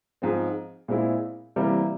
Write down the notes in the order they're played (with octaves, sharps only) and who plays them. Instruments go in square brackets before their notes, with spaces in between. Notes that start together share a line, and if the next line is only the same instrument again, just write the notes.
[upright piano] G#2 F3 C4
A#2 G#3 C4 E4
C3 E3 G3 A#3